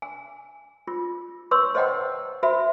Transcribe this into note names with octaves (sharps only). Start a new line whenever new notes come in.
G#5
F4
B4 C#5 C6 C#6 E6
C5 C#5 D#5 F#5 G5 A#5
F#4 C5 E5 B5